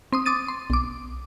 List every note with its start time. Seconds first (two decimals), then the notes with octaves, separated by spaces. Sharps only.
0.12 C4 C6 D#6
0.26 D6 D#6 A6 D#7
0.48 C6
0.70 B1 D6